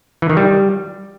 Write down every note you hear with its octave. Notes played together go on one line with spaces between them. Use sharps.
E3
D#3
G3